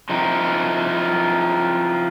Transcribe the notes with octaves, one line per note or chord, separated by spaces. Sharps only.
F3 C4 D#4 E4